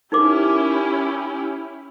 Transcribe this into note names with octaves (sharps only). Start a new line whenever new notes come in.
C#4 D#4 E4 G4 A#4 D6